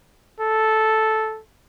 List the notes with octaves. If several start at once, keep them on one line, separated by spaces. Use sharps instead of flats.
A4